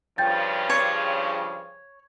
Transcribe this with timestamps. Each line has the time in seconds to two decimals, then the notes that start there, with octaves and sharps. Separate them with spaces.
0.18 G2 C#3 F3 G5 G6 A6
0.70 C#5